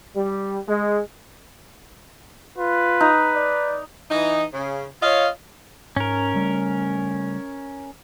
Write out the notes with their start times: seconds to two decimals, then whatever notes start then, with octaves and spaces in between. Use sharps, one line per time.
0.15 G3
0.68 G#3
2.58 F4 B4
3.00 D#4
3.34 D5
4.11 E3 D#4
4.54 C#3
5.02 F4 C#5 D#5 F5
5.96 G#2 C#4 A#4
6.34 C#3 G3 A3